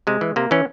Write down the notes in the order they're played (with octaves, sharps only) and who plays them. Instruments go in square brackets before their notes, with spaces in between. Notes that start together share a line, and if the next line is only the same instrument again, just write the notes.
[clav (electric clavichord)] C3 G#3
E3
C3 A#3
E3 C#4